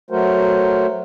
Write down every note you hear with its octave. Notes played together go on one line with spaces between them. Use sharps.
F#3 A3 F#4 A#4 C5